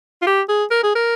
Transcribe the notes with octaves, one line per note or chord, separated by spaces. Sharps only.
F4
G4
G#4
A#4
G#4
A#4